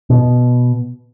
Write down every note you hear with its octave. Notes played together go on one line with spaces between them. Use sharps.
B2